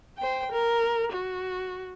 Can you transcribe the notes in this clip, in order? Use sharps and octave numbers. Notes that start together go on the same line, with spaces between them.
C5 G5
A#4
F#4